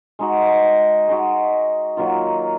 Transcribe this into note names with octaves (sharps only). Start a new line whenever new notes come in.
G#3 D#4 F#4
G#3 D#4 F#4
D#3 F#3 A#3 F4